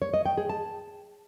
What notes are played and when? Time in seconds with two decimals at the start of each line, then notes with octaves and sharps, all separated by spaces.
0.02 C#5
0.14 D#5
0.26 G5
0.38 G#4
0.49 A5